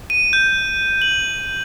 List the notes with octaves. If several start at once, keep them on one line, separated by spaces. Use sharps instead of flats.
D#7
G6
F#7